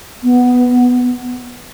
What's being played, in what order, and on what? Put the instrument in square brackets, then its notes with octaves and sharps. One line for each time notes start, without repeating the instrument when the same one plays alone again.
[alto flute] B3